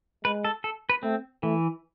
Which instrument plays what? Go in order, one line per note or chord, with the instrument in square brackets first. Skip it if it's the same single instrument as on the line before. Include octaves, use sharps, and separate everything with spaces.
[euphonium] G#3 [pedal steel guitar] B4
[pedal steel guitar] A4
A4
B4
[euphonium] A3 [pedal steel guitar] C4
[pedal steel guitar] E3 [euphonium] A3